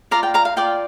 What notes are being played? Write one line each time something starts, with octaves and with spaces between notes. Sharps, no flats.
F4 D5 F5 A#5
G5
F5 A#5
F5
F4 D5 G5